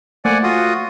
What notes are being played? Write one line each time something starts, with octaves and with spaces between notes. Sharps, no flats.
A3 A#3 C5 D5 F#5 G#5
F4 F#4 D#6